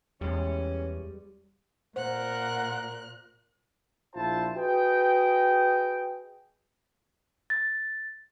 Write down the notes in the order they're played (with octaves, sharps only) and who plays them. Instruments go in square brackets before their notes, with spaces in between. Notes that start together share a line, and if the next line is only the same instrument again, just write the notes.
[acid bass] E2 [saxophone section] E3 C#4 [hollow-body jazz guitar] G3 G#3
[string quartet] A#2 F#6 [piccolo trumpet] A#4 [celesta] C5 [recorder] F#5
[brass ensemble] A#1 E4 F4 C5 A5
F#4 G#4 B4 D#5 G5
[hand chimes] A6